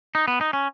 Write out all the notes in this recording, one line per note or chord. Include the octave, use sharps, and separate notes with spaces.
D#4
B3
D#4
C#4